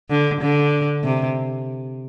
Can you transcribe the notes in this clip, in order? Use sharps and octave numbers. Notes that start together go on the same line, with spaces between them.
D3
D3
C3